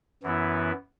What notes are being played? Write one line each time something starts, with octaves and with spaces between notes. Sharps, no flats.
F#2 E3 B3 E4